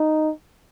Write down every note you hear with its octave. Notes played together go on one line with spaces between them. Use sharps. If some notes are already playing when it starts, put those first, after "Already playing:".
Already playing: D#4